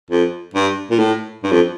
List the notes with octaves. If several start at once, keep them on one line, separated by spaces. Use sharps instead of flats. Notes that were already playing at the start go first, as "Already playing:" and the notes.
F2
G2
A#2
A2
G2
F2